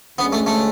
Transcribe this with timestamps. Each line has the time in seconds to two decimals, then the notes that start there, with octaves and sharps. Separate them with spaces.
0.18 D2 D3 G#3 B3 C#4 G#4
0.33 A3
0.46 A3